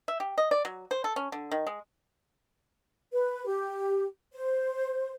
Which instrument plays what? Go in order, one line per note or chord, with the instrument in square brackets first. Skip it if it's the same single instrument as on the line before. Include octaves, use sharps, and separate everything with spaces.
[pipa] E5
G4
D#5
D5
F#3
C5
A4
C#4
D3
D#3
G#3
[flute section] B4
G4
C5